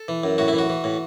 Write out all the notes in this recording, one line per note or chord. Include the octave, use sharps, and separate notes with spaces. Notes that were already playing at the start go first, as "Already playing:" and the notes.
Already playing: A4
E3
F#2
A2 F#4
E4
E3
F#4
E3
A2